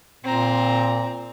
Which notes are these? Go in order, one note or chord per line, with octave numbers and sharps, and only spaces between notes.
A#2 C4 A#5